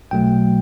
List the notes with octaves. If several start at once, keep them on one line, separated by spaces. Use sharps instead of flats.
B1 B2 F#3 A3 G5